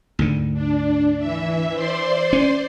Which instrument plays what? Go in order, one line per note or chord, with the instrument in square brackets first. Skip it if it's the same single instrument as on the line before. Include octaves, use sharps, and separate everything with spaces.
[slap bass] D2 G#2 D3
[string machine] D4
E3 E5
C5 D5 C6
[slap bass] C#4